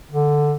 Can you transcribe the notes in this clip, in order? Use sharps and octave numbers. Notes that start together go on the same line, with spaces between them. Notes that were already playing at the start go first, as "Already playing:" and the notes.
D3